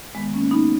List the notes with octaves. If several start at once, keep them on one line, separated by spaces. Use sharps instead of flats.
D#3 G#3 B3
A#3 C#4
G#2
B3 D#4